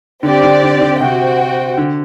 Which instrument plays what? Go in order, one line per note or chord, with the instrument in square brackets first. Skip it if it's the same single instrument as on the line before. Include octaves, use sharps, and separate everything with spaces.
[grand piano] D3 [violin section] C4 G4 D5
[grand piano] D3
D3
D3
[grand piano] C3 [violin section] F#4 C5 G5
[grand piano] D3